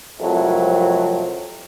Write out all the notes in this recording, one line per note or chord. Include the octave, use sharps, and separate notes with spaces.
C2 F2 F3 F#3 A3